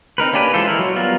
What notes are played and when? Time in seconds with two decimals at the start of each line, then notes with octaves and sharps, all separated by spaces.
0.18 C4 D#4 A#4 B4
0.33 A#3 C#4 D4 G4 B4
0.54 E3 G#3 F4 A4 C5
0.68 E4 A#4
0.79 F#3
0.96 G3 B3 F4 A#4